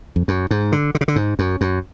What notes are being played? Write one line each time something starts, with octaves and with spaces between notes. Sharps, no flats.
F2
F#2
G#2
D3
D3
C#3
D3
G#2
F#2
F#2